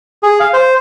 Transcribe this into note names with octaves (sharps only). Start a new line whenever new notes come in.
G#4
F5
C5